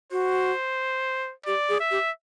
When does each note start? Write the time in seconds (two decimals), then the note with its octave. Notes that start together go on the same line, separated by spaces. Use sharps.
0.11 F#4 C5
1.46 G4 D5
1.69 G#4
1.80 E5
1.91 G4